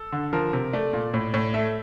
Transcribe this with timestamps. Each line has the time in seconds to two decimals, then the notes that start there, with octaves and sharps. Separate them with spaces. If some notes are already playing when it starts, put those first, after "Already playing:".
Already playing: A4
0.12 D3
0.33 F3 A#4
0.53 C3
0.73 A3 D5
0.93 A#2
1.14 A2
1.34 A2
1.54 A3 E5